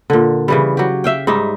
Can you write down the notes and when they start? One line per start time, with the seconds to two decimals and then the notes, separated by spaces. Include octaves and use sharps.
0.10 A#2 D3
0.48 C#3 E3 G3
0.77 F#3 G4
1.04 E5 F5 G5
1.27 G#2 G3 D#4 E5